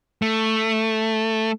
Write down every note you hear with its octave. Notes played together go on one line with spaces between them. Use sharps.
A3